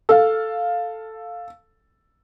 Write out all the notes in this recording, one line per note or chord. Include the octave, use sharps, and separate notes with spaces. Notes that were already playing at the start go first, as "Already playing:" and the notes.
A4 F5